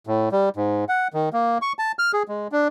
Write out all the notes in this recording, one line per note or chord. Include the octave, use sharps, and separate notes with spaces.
A2
G3
G#2
F#5
D#3
A#3
C#6
A5
F6
G#4
G#3
D4